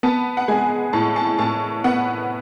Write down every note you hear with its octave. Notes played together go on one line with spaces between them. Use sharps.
B3 A5
F#5
G#3 G#5
A2 A5
A5
A2 A5
B3 F#5